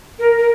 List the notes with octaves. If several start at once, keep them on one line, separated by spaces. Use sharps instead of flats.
A#4
A#4